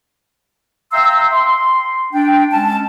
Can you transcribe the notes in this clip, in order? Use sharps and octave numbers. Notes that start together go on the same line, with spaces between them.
E5 F5 G5 A#5 C6 E6
C6
D4 G5
G#3 C#4 A5